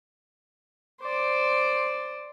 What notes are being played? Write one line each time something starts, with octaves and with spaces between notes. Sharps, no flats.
C5 D5